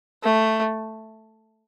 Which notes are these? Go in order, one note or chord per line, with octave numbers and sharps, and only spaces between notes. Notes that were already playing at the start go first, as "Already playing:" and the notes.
A3